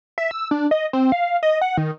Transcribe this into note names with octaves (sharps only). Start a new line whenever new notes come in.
E5
E6
D4
D#5
C4
F5
D#5
F#5
D#3